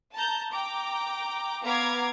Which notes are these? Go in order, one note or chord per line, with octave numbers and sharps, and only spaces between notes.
A5 A#5 G6
G5 A#5 D6
B3 F5 A#5 D6 G#6